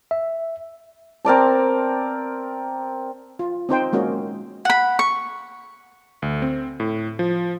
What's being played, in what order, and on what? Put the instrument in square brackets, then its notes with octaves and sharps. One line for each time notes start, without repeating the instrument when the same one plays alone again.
[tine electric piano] E5
[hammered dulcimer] C4 A#4 D5 A5
[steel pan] F4
C4 D#4 C5 G5
G#3 A#3 C#4 F#4 D#5
[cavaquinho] F#5 B5
C#6
[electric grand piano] D2
C4
A2
F3